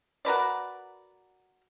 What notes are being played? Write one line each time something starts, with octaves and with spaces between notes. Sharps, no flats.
F#4 A#4 B4 D5